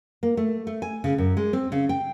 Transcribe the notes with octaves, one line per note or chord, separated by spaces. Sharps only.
A#3
A3
A3
G#5
C#3
F#2
G#3
C4
C#3
G5